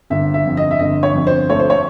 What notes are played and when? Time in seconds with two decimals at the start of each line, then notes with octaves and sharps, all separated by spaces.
0.10 G1 E5
0.34 E5
0.46 F2
0.57 D#5
0.71 E5
0.79 G1 D#5
1.03 C#5
1.14 F2
1.27 C5
1.49 A3 C#5
1.60 C5
1.70 C#5